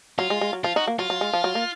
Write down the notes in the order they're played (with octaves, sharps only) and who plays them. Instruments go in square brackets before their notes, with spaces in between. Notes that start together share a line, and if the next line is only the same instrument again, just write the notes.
[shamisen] F#3 [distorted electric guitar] F4
[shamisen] G#3
G#3
F#3
[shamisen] F3 [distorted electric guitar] F4
[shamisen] D#4 [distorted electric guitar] F#4
[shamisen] A#3
[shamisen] F#3 [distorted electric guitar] F4
[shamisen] F#3
G#3
F3
F#3
A#3